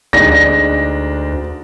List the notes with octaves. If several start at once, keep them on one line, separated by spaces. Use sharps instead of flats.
D2 G#3 D4 D#4 A#6